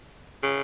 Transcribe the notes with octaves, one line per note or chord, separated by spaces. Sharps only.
C#3